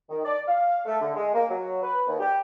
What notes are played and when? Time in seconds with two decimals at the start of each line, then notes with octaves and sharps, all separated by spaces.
0.10 D#3
0.24 D5
0.47 F5
0.85 A3
1.00 D3
1.14 G#3
1.34 A#3
1.50 F#3
1.82 B4
2.07 D#2
2.19 G4